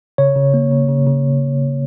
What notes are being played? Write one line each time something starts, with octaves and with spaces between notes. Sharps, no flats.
C#3 C#5
C#3
A#3
C#3
C#3
C#3